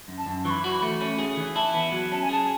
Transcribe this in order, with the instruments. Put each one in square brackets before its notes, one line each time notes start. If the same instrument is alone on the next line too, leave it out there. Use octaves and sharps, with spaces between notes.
[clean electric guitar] F#2
[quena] A5
[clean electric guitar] F#2
[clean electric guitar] E3 [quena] C#6
[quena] B5
[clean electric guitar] F#4
A3
C#4
G#4
E3
[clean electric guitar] E4 [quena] A5
[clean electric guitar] B3
F#3
[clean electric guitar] C#4 [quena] A5
[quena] G#5
[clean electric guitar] G#4 [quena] A5